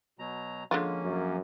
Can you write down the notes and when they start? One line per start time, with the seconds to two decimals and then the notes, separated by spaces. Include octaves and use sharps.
0.19 B2 F#3 A#5
0.71 D3 F3 G#3 A#3 C#4 F4
1.04 F#2